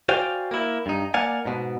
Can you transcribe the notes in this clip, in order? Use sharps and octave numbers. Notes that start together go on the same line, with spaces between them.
F#4 C5 D5 F5 G5 G#5
A#3 E4
G2 D#4
A#3 D5 F5 F#5 G#5
G#2 B2